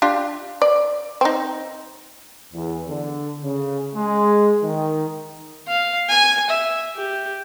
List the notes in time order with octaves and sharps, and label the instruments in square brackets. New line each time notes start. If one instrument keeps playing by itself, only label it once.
[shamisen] D4 F4 G4
D5
C4 D#4
[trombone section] E2
D3
C#3
G#3
D#3
[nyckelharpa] F5
G#5
E5
G4